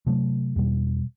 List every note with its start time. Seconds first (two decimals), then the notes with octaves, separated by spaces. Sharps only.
0.06 C3 F#3 A3
0.56 E2 B2 G3